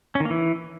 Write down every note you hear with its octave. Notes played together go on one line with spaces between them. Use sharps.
C#4
D#3
A#3
E3